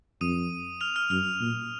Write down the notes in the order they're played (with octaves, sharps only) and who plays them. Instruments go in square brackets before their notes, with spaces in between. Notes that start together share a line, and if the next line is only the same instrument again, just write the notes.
[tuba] F2 [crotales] D#6 D#7
[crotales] F6 F7
F6 F7
[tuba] F#2 [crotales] F6 F7
[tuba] A#2